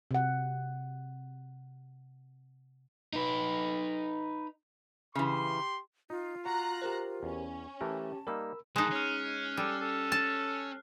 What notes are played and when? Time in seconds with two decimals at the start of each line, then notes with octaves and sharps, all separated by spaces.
0.11 C3 F#5
3.13 D#4 B4
5.15 C#3 E3 G4 C6
6.10 D#4 F4
6.46 F#4 A#5 F#6
6.82 G4 A#4 C5
7.23 E2 C#4
7.81 E3 A3 G4 A#4 A5
8.27 G3 A#3 D#4 A#4 B5 E6
8.76 D#3 G#3 D#4 A5 F#6
8.91 C#4 F6 C7
9.57 G3 A4
9.81 A4
10.12 A5